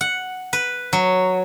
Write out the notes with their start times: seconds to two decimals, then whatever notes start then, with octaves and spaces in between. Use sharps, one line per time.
0.01 F#5
0.53 B4
0.93 F#3